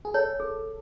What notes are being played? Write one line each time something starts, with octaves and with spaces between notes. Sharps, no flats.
G#4
A4 C#5
G#4